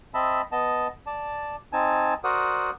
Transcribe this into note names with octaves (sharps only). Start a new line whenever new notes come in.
C4 D#5 E5 A5 B5
B3 D#5 A5
D5 A5
C4 D#4 G#5 A5
F#4 A#4 C5 D5 F#5 D#6